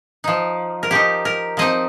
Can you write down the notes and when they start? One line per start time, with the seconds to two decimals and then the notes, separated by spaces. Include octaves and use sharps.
0.24 F3 D#4
0.83 A#4
0.91 F3 D#4 G4
1.25 A#4
1.57 F3 C4 D#4 D#5